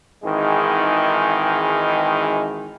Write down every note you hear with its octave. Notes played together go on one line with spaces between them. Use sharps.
G#1 G#2 D#3 E3 G#3